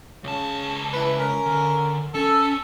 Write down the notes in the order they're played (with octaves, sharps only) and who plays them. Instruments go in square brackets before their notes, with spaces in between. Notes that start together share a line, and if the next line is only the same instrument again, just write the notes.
[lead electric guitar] C#2 A5 [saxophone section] C#3
[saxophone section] E3 E4 B4
C#4 A#4
[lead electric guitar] D3
[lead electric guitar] C#4 [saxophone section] A4